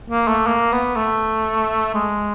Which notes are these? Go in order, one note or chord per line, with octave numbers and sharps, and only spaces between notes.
A#3
A3
A#3
B3
A3
G#3